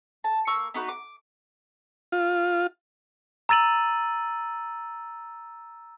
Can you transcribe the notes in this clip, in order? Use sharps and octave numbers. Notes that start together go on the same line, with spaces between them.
A5
A#3 C#6 E6
B3 D#4 F#4 B4
D6
F4
A#5 E6 A6 D#7 F#7